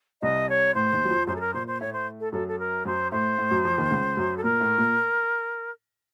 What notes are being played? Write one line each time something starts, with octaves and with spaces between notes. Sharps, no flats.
C2 C3 D#5
C#5
A1 A2 C5
D#2 D#3
F#3
F2 F3
F#2 F#3 C5
A4
A#4
A#2 A#3 C5
C5
A2 A3 C#5
C5
A4
F#2 F#3 A4
A4
A#4
F#2 F#3 C5
A2 A3 C5
A2 A3
F#2 F#3
F2 F3
D#2 D#3
C#2 C#3
F#2 F#3
A4
A#2 A#3 A#4
A2 A3
A#2 A#3